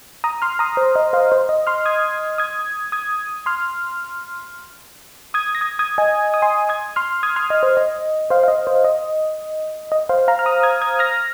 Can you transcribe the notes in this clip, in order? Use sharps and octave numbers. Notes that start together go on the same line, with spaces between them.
A#5 D#6
C6 F6
A#5 D#6
C5
D#5
C5 F5
C5
D#5
C6 F6
D#6 G#6
D#6 G#6
D#6 G#6
C6 F6
D#6 G#6
A#6
D#6 G#6
D#6 G#6
D#5 G#5
D#6
G#5 C6
D#6 G#6
C6 F6
D#6 G#6
C6 F6
D#5
C5
D#5
C5 F5
F5
D#5
C5
D#5
D#5
C5 F5
F5 A#5
F6
A#5 D#6
D#6 G#6
D#6 G#6
F6 A#6